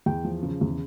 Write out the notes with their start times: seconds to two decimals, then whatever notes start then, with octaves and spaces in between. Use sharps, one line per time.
0.06 E2 G5
0.24 F3
0.43 C#3
0.61 E2